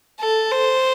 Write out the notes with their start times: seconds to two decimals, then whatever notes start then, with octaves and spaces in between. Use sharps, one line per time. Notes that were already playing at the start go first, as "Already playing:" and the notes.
0.20 A4
0.51 C5